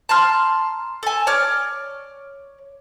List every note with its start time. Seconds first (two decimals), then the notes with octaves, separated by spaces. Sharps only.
0.09 A5 A#5 C6 F6
1.03 A4 G#5
1.27 C#5 D5 F6